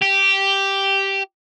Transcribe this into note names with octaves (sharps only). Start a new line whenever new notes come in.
G4